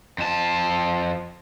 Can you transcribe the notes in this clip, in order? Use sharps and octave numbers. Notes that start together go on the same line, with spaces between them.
F2 A5